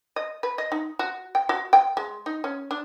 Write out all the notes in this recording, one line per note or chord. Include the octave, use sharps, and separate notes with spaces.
D#5
B4
D#5
D#4
F#4
G5
F#4
G5
G#3
D#4
C#4
D4